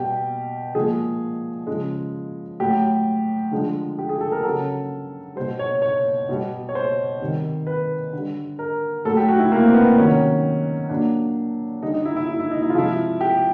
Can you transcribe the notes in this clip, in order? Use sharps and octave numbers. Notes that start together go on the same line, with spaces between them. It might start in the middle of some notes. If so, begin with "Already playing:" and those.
Already playing: B2 G3 G4
A#2 F3 G#3 G#4
C#3 F3 G#3
A2 F#3 G4
D3 F3 G#3
G4
G#4
A4
A#4
C#3 F#3 A4
B2 G3 C5
C#5
C#5
B2 G3
C#5
C5
C3 D#3 G3
B4
D3 G3
A#4
A2 F#3 A4
G4
F#4
E4
A#3
C4
B3
C3 D#3 F#3 C#4
A#2 F#3 D4
D3 G3 D#4
D#4
E4
E4
E4
E4
D#4
E4
F4
C3 F3 G#3 E4
G4